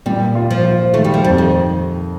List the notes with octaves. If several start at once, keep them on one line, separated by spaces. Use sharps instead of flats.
A#2 G3
F4
F3
F4
D#3 A3
G3
F3
F2 G3
D#3